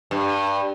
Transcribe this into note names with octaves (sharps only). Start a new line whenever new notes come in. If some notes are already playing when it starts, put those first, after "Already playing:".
G2